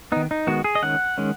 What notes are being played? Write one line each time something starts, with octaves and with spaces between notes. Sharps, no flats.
D#3 B3 D#4
D#4
D#3 G#3 B3 F#4
G#4
D#5
D#3 G#3 C#4 F#5
D#3 G#3 C#4